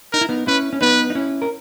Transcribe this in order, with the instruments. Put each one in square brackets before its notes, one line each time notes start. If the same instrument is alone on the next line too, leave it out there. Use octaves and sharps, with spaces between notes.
[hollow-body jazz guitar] D#4 [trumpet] A#4
[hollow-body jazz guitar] E4
B3 D#4
[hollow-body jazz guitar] C#4 E4 [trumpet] B4
[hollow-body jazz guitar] C#4
[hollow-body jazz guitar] B3 D#4 [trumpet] B4
[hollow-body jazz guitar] D#4
C#4 E4
A#4